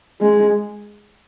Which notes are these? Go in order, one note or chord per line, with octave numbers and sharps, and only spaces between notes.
G#3